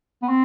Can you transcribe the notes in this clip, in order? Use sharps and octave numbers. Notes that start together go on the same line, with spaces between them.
B3
C4